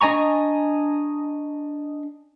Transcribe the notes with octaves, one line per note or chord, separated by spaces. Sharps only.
D4 D#5 G#5 A#5 C#6